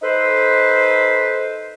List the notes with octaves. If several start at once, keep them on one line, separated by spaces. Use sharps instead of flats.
D#4 A4 B4 C5